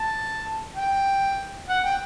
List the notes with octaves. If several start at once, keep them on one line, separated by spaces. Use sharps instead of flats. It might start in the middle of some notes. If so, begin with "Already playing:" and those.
Already playing: A5
G5
F#5
G5